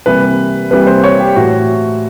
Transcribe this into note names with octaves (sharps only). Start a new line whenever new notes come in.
C3 E3 G3 A#3 B4
C3 E3 G3 A#3 B4
C5
C#5
G4
A2 E3 A3 F#4